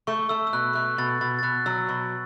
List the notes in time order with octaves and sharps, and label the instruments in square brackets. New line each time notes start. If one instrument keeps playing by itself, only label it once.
[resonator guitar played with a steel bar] A3 [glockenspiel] C#6
[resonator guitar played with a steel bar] A3 [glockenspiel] E6
[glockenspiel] E6
[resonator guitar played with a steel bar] B2 [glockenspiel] F#6
[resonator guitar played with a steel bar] A3 [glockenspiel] F#6
[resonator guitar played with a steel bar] B2 [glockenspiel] A6
[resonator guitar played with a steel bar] B2 [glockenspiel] A6
[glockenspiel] A6
[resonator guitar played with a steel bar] B2 [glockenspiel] F#6
[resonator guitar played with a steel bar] F#3 [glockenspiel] E6
[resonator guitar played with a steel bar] B2